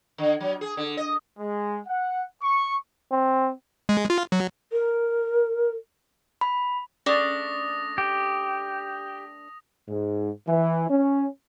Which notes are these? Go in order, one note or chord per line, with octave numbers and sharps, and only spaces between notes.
D3
F#3
G#4
D3
D#5
G#3
F#5
C#6
C4
G#3
F4
F#3
A#4
B5
A3 C#4 D4 G#4 D5 D6 D#6 A#6
G4
G#2
E3
C#4